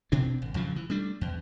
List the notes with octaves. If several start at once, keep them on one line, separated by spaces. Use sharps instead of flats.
B2 C4 D4
G#1
A#1 C#3 F3 F#3
E3
G3 A3 D4
E2